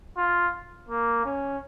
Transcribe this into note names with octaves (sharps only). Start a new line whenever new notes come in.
F4
A#3
C#4